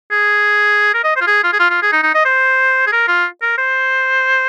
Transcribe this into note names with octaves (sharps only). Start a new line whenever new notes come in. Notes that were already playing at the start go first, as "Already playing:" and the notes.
G#4
A#4
D#5
C5
F4
G#4
F4
G#4
F4
F4
G#4
D#4
D#4
D#5
C5
G#4
A#4
F4
A#4
C5